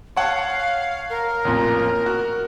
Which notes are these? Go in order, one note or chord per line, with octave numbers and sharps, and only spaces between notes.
C#5 F5 F#5 A5
A#4
A1 F2 A#2
F#4